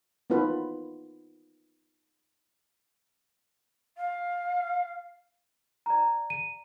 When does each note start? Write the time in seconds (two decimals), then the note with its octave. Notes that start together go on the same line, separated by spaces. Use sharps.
0.30 B3 D#4 F4 B4
3.97 F5
5.86 D5 A#5
6.30 D#7